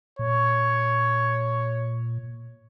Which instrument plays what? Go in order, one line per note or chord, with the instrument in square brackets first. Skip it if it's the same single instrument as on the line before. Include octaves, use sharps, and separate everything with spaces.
[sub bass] A#2 [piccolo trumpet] C#5